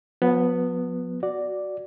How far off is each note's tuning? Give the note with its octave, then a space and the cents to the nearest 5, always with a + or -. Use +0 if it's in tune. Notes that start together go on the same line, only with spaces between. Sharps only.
F3 +45 B3 +0
F#4 +0 D5 +0